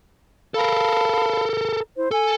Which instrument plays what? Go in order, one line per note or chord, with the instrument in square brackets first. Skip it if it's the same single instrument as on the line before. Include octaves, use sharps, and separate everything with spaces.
[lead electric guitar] A4 A#4 [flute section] F5 A5 B5
[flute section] E4 C5
[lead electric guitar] A4 [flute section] G#5